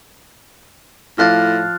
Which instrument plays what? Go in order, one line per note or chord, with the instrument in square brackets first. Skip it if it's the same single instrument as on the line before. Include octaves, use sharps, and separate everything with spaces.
[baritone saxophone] A2 [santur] F3 F5 D6 [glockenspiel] F6 F#6 A6